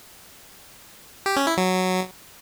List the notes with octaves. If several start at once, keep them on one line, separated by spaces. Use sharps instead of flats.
G4
C#4
E4
F#3